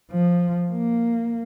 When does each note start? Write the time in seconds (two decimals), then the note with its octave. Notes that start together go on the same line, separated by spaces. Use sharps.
0.12 F3
0.71 A#3